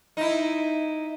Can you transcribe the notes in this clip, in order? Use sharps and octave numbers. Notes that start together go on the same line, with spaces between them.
D#4 E4